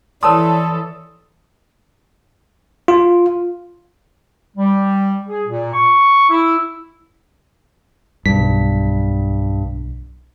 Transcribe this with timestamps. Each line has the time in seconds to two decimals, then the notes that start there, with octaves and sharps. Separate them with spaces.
0.23 E3 A4 C#5 D5 A5 C6 D#6 E6
2.88 F4
4.56 G3
5.28 G#4
5.47 A#2
5.74 C#6
6.30 E4
8.26 B1 G2 B6